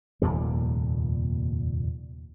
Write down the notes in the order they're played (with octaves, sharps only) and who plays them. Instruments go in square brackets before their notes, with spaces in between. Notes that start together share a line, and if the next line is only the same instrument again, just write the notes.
[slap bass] F1 D#2 A#2 G3